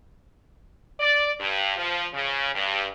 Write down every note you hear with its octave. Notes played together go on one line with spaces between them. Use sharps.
D5
G2
F3
C#3
G2